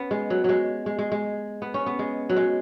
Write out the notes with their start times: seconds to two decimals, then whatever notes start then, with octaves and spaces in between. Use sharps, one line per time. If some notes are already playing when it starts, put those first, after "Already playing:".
Already playing: B3 C#4
0.11 G#3
0.30 F#3
0.44 F#3 G#3
0.86 G#3
0.99 G#3
1.12 G#3
1.62 B3
1.74 C#4
1.86 B3
1.99 G#3
2.29 F#3
2.36 G#3